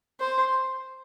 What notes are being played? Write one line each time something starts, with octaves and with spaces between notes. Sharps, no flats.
C5